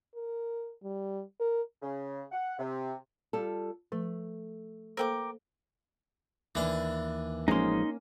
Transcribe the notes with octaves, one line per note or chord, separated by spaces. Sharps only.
A#4
G3
A#4
C#3
F#5
C3
G3 F4 A4
F3 A3
A#3 A4 A#4 C5 G5 D6
D#2 E3 D4
A1 F3 G#3 A#3 C#4 D#4 C6